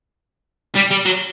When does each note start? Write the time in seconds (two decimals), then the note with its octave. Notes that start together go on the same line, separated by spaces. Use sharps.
0.76 G3
0.91 G3
1.06 F#3